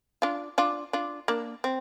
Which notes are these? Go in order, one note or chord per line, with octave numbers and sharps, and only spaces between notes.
D4 F4
D4 F4
D4 F4
A#3 D4
C4